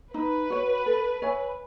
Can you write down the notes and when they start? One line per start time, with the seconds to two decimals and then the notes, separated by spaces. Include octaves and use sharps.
0.14 D#4 B4
0.50 F#4 C#5
0.86 A4
1.22 C#5 E5 G#5